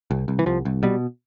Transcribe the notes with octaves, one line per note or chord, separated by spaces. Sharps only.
C2
C2
E3
C2 F3
C2
B2 G3